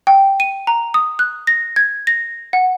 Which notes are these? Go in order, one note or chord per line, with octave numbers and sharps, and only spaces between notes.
G5
D#7
A#5
D#6
F#6
A#6
G#6
A#6
F#5